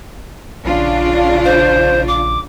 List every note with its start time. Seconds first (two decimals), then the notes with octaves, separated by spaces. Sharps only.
0.65 A#1 C#3 D4 F4
1.45 C5
2.08 D6